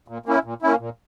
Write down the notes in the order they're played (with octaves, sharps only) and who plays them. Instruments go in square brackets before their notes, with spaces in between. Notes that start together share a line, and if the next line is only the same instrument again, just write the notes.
[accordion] A#2
A#3 C#4 E4
A#2
A#3 C#4 E4
A#2